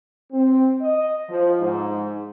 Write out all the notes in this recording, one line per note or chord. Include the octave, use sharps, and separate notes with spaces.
C4
D#5
F3
G#2